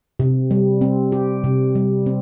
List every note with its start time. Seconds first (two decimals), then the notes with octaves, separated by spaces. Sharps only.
0.19 C3
0.51 G3
0.81 C4
1.12 G4
1.44 C3
1.75 G3
2.06 C4